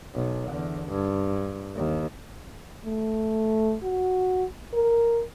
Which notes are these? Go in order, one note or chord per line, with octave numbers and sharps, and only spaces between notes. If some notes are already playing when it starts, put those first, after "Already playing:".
B1
E2 D3
G2
D#2
A3
F#4
A#4